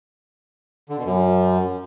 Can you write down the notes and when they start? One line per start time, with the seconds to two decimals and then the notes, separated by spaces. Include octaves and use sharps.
0.89 D3
0.97 B2
1.05 F#2